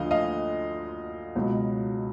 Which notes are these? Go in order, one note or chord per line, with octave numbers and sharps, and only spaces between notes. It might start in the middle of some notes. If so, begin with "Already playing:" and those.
Already playing: D2 D3 F3 D#5 F5
D#5 F5
C#2 B2 F#3